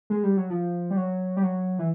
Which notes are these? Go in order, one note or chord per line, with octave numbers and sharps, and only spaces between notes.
G#3
G3
F#3
F3
G3
F#3
G3
F#3
E3